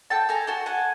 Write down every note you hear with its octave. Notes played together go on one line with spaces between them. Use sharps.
A4 G5 A5
A4 G#5 A#5
F#4 G5 A5
A4 F#5 G#5